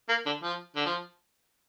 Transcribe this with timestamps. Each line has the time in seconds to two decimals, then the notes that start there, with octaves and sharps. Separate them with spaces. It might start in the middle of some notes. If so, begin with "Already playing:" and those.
0.09 A#3
0.26 D3
0.43 F3
0.76 D3
0.86 F3